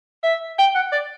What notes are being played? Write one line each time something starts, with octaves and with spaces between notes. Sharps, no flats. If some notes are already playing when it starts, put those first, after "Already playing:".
E5
G5
F#5
D5